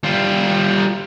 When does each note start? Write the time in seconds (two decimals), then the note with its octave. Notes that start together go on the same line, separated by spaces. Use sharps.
0.04 G3 F4